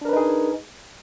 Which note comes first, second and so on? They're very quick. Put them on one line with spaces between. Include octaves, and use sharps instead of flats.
D4 A#4 B4 D#4 G#4